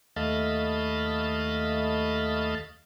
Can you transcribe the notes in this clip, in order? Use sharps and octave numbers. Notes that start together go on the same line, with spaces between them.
D#2 A3 D#5 F5 A5 B5